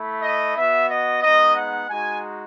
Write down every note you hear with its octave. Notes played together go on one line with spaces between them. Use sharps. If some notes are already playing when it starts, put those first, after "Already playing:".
Already playing: A3 E4
D#5
B3 F#4 E5
D#5
G#3 B3 D#4 D#5
F#5
G#3 D#4 F#4 G#5